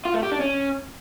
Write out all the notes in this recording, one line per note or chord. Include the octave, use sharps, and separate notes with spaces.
F4
A3
G4
D4
C#4